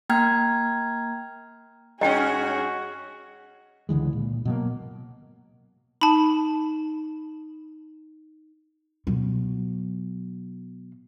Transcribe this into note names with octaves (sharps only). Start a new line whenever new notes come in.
A#3 G5 A#5 F6 G#6
G2 C#4 F#4 G#4 D#5 G5
C#2 D3 E3 G#3
A#2
B2 F#3 A#3
D#4 A5 B5
B2 F#3